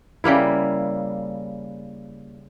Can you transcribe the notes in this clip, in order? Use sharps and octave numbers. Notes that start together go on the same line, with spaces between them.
C#3 G3 A#3 E4